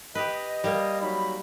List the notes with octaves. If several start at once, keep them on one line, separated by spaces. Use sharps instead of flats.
G4 B4 D#5
G3 A#3
F#3 D#4 B5